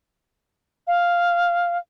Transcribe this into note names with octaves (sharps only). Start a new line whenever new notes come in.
F5